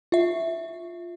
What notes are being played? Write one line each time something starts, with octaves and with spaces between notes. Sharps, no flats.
F4 E5